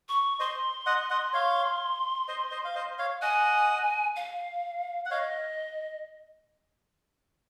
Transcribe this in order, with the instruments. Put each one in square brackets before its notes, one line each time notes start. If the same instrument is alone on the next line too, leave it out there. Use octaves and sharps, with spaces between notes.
[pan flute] C#6
[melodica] C5 D#5 [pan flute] C6
[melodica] D#5 F#5
D#5 F#5
C#5 F5
C5 D#5
C5 D#5
F5
C5 D#5
C#5 F5
[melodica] D#5 F#5 [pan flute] G#5
[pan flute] F5
[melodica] F#5
[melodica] C#5 F5 [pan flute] D#5